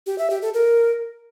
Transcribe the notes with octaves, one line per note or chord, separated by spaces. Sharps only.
G4
E5
G4
A4
A#4